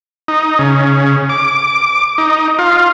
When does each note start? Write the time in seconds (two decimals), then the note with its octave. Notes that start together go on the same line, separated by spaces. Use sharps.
0.28 D#4
0.59 C#3
1.29 D6
2.18 D#4
2.59 F4